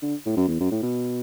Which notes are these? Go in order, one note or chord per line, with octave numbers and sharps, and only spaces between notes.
D3
A2
F#2
E2
F#2
A2
B2